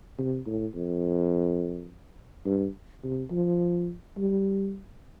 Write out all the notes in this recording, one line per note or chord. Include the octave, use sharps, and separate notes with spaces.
C3
A2
F2
G2
C3
F3
G3